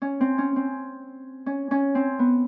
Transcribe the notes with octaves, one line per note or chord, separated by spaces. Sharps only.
C#4
C4
C#4
C4
C#4
C#4
C4
B3